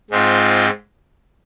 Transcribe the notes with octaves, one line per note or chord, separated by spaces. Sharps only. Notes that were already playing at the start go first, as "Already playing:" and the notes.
G#2 G#3 C4 F4